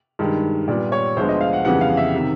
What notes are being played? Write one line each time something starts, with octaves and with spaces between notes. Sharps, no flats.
G2 D#3 G#3
A#2 G3 B3 D5
C#5
D2 D3 F3 G#3 B3 C5
D#5
F5
F#5
F2 C#3 E3 G3 B3 F#5
F5
E5
C3 D#3